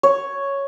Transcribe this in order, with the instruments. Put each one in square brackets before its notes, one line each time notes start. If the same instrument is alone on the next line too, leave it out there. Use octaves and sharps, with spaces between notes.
[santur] C#5